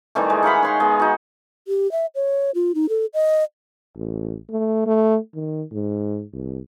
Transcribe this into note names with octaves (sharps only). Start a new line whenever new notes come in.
D#3 E3 G3 A3
G#3
D#4 F5 F#5 B5
C#5 C6 C#6
G#3 B3
D#4 F#4
G4
E5
C#5
F4
D#4
A4
D#5
A1
A3
A3
D#3
G#2
C2